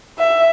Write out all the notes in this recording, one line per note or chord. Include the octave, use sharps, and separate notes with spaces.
E5